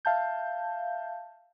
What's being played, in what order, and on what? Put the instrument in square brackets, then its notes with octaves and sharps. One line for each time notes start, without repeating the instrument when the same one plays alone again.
[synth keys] E5 F5 A5 G6